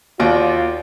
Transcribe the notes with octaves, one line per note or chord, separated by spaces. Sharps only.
D#2 F4 F#4 D5 G5